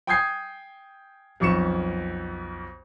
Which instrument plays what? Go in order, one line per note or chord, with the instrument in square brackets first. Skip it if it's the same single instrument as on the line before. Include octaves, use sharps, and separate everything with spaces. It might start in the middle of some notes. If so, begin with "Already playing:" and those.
[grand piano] G5 G#5 D#6 G6 G#6 C7
B1 F2 C#6 C#7 E7